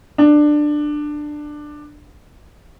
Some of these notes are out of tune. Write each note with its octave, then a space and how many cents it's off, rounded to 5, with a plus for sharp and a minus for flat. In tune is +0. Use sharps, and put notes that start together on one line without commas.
D4 +15